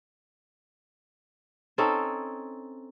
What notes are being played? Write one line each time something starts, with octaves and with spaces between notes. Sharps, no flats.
C4 C#4 D#4 A4